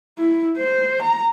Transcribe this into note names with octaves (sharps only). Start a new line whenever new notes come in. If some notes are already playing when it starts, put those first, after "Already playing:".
E4
C5
A#5